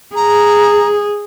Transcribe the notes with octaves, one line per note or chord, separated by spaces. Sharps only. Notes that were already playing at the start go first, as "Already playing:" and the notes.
G#4 A#5